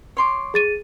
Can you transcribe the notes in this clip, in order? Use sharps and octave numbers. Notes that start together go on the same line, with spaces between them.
C#5 C6 D6
G#4 A6 D#7